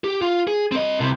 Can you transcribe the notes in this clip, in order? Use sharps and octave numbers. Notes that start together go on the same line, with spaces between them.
G4
F4
G#4
C4 D#5
C2 C3